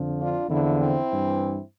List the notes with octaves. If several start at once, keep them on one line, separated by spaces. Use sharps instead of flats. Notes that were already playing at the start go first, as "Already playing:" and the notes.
Already playing: F2 D3 F3
D4 F4
E2 D3 F3 C4 E4
C4 E4
G2 E3